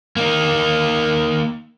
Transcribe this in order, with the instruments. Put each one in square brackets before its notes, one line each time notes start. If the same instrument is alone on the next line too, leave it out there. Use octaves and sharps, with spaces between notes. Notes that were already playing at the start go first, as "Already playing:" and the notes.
[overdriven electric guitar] A#3 D#4